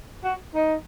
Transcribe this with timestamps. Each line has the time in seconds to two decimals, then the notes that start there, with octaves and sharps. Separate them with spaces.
0.24 F#4
0.55 D#4